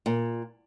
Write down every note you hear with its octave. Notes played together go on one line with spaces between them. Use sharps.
A#2